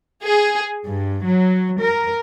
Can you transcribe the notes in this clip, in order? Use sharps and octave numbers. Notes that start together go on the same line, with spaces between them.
G#4
G2
F#3
A#4